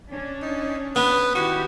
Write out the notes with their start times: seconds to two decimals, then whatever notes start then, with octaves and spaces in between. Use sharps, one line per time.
0.11 C#4 D4
0.42 D#4
0.96 B3 B4
1.35 D#3 E4 F#4 G4